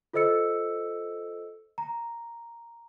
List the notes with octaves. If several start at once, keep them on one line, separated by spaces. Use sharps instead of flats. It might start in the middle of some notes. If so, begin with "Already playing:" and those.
F4 A4 C5 D#5 E6 C#7
A#5